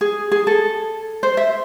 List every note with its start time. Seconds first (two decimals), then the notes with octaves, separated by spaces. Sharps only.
0.01 G#4
0.32 G#4
0.47 A4
1.23 C5
1.37 E5